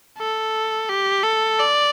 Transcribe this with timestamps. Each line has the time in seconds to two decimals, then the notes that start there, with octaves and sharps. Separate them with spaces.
0.18 A4
0.89 G4
1.24 A4
1.59 D5